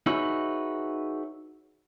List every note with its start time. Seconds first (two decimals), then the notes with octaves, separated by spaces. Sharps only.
0.06 D#4 F#4 G#4 B4 C#5 E5